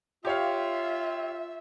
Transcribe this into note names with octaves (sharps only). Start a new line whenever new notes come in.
F4 G4 C#5 E5 F5